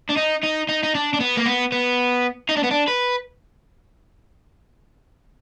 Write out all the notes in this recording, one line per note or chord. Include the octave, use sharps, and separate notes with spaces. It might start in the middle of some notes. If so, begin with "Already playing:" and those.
D4
D#4
D#4
D#4
D#4
D4
D4
B3
A#3
B3
B3
D#4
D4
B3
D4
B4